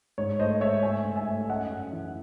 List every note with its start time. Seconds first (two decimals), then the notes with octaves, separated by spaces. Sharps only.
0.18 G#2 C#5
0.39 A3 C5 D#5
0.61 G#2 C#5 E5
0.83 A3 E5 G#5
1.05 G#2
1.16 E5 G#5
1.28 A3
1.41 E5
1.49 F#2 D#5 F#5
1.71 F#2
1.93 E3